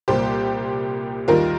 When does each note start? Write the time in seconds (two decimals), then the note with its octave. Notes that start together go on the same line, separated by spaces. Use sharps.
0.08 C2 A#2 G3 G4 C5
1.28 D#2 D#3 G3 F4 A#4